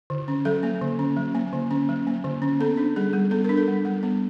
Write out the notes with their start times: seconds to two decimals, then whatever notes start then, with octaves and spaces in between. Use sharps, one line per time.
0.10 D3
0.28 C#4
0.45 F#3 A4
0.63 A#3
0.81 D3
0.99 C#4
1.17 F#3
1.35 A#3
1.53 D3
1.71 C#4
1.89 F#3
2.07 A#3
2.24 D3
2.42 C#4
2.60 B3 A4
2.77 D4
2.96 G3 G#4
3.13 G3
3.31 B3 A4
3.44 D4 A#4
3.57 A4
3.68 G3
3.85 G3
4.03 B3